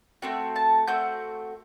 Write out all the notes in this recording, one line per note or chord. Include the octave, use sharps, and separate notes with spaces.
A3 C4 F#4 G5
A5
A3 C4 F#4 G6